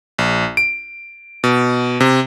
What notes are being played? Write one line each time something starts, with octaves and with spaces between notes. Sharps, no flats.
A#1
D7
B2
C3